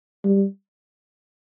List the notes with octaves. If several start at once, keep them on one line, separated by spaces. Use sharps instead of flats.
G3